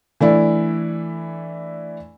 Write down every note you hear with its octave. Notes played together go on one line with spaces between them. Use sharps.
E3 A3 D4 E4 D5